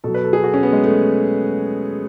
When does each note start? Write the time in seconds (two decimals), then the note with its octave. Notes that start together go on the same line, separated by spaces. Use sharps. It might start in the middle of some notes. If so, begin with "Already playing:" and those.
0.04 B2 F#3 A4
0.14 B4
0.24 A4
0.33 G#4
0.44 F#4
0.54 C#4
0.63 B3
0.73 G#3
0.84 A3